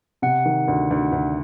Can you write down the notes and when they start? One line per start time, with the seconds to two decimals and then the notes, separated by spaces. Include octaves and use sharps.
0.22 C3 F#5
0.46 D#3
0.68 D2
0.91 D2
1.12 D2